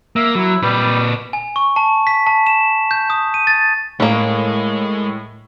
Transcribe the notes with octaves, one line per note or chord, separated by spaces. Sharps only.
A#3 E5
F#3 E4
A#2 G3 B4
G#5
C#6
A5
B6
A5
E7
G6
D#6
D#7
A6
A2 G#3 A#3 C#4